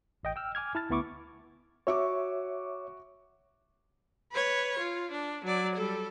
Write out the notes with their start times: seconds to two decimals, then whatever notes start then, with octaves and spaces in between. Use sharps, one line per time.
0.23 A1 D#5 G5
0.36 G5 E6 F6
0.55 G#5 D6 F6 G#6
0.75 E4 A5 F6 A6
0.90 D2 B3 E4 C#6 D6
1.87 F#4 C#5 E5 C#6 D6
4.32 B4 C#5
4.79 F4
5.11 D4
5.44 F#3 D5
5.76 G3 A4